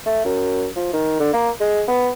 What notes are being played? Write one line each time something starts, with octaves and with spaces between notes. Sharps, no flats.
A3
F#2
F3
D#3
D3
A#3
G#3
B3